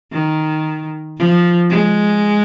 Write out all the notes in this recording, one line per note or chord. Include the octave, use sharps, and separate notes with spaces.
D#3
F3
G#3